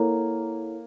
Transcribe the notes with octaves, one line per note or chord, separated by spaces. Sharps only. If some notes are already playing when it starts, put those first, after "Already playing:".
Already playing: A#3 E4 A4 C#5 F#5 A#5